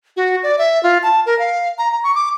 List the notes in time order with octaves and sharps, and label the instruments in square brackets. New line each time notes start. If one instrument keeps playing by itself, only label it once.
[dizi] F#4
D5
E5
F4
A5
A#4
F5
A#5
A#5
C#6
D6